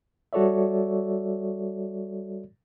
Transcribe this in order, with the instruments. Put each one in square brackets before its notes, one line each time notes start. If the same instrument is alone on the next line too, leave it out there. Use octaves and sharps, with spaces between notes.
[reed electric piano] G3 F#4 A4 C#5 D5 E5